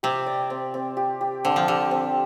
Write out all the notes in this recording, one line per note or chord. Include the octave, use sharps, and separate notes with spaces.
C3 G4
D5
C4
C4
G4
G4
D3 C4
F3
D3 G4
C4